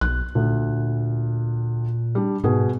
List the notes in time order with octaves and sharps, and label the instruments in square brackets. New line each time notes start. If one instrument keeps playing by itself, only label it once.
[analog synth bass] B1 [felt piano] F#6
[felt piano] D2 [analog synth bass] A#2
[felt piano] G3 D4
[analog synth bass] G#2 [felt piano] B2 G#4